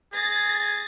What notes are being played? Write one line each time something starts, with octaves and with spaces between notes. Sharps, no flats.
G#4 A6 A#6